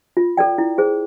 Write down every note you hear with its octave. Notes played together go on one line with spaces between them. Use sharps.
F4
A4 D5 G5
E4
G#4 C5